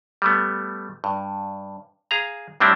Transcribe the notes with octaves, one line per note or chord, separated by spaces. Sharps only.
G3 A3 B3
G2
G#4 F5 A#5
A2 G3 C4 D4 E4